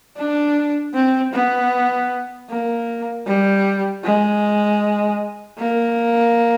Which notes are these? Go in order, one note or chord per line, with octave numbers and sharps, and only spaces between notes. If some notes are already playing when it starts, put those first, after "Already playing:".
D4
C4
B3
A#3
G3
G#3
A#3